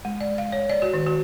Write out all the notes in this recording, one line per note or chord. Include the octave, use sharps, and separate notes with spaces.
G#3
D5
F5
C#5
D5
F#4
D#3
F#4